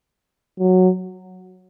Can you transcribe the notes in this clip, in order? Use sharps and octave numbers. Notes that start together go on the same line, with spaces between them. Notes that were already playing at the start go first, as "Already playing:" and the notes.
F#3